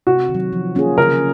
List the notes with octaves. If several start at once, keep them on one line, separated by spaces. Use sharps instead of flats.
C3 F#4
D#3
F#3
F3
A#3 C#4 F4 G#4
C#3 A#4